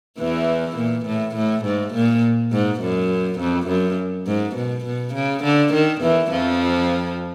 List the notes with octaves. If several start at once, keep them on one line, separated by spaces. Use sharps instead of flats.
E2 E3
A#2
A2
A2
G#2
A#2
G#2
F#2
F2
F#2
G#2
B2
B2
C#3
D3
D#3
E2 E3
F2 F3